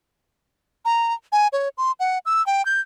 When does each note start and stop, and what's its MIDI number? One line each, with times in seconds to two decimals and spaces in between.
0.85 1.14 82
1.32 1.48 80
1.53 1.69 73
1.78 1.92 84
2.00 2.18 78
2.26 2.45 88
2.46 2.65 79
2.66 2.81 91